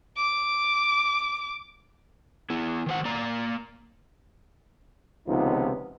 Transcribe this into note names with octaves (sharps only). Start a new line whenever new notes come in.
D6
B3 E4
D#3 C5 F#5
A#3 D5 A#5
C#2 C3 D#3 F3 B3 D#4